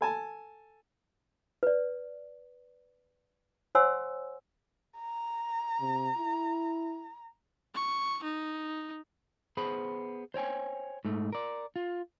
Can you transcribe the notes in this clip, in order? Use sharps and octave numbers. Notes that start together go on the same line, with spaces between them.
A4 G#5 A5
B4 D5
C5 C#5 F#5 G#5 C6 E6
A#5
C3
E4
C#6
D#4
B3 G#4 C5 B5
C5 C#5 G5 G#5
G#2 A3
A#4 D5
F4